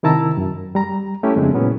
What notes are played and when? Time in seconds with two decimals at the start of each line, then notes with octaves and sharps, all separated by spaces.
0.03 C3 D#3 E4 A5 A#5 E6
0.37 F#2
0.75 G3 A#5
1.23 A3 C#4 E4 G4
1.36 F2 C#3 G#3 C4 D4
1.54 A#2 F#3 B3 C#4 E4